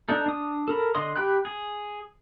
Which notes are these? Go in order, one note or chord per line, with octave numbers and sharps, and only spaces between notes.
D4 D#4 A4
D4 D#6
A4 A#4 B5
D3 D#5 C6 D#6
G4 G5 B5 F#6
G#4